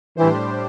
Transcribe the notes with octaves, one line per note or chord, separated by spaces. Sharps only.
A2 E3 G3 D4 G4 C5